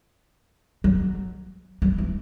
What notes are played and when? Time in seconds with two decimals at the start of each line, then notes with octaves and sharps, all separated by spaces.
0.84 F#3
1.82 F#3
1.98 E3